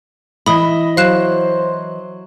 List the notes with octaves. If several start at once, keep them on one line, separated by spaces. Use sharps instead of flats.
E3 D#5 E5 B5 D#6
F#3 C5 F5 F#6 E7